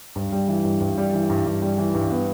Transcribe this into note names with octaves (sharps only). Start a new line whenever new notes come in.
G2
G3
E3
G2
G2
G3
E3
G2
G2
G3
E3
G2
B3